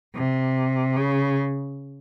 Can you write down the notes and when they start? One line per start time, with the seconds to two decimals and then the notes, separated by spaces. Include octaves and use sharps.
0.15 C3
0.96 C#3